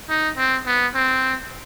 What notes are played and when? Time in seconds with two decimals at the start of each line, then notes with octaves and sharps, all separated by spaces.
0.10 D#4
0.37 C4
0.67 B3
0.95 C4